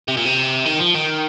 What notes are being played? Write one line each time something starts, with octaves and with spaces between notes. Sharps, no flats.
C3
A#2
C3
D#3
F3
D#3